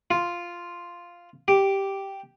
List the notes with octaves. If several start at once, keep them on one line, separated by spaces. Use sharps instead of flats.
F4
G4